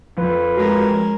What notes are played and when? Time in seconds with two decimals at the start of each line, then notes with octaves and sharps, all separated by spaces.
0.18 F2 F3 B4
0.57 G#3 C#4 F#4 A#4